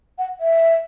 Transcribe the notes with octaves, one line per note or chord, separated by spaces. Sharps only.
F#5
E5